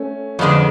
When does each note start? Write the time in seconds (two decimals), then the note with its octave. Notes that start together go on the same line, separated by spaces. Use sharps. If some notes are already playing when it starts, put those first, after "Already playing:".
Already playing: A3 C#4
0.39 F2 D3 G#3 B3 D4